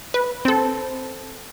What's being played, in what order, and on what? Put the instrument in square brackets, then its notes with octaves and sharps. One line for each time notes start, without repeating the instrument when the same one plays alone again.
[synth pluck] B4
C4 A4